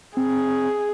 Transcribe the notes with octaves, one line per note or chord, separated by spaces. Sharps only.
C4 G#4